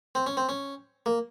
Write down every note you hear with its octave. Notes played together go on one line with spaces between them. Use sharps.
C4
C#4
C4
C#4
A#3